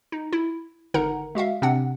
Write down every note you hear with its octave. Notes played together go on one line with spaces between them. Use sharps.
D#4
E4
G#1 D3 D#4 A#4 F#5 A#5
G#3 F#4 E5 F5
C3 C4 D4 F#5